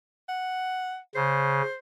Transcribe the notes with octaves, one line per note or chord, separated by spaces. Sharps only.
F#5
C#3 C5